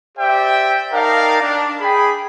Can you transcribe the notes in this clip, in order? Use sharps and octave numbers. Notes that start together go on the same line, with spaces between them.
G4 C5 D5 E5 G5
D#4 A#4 D5 F5 G5 A5
D4
G#4 G5 B5